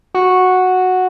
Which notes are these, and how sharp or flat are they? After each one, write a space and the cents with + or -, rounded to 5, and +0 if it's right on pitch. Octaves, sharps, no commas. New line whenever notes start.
F#4 -5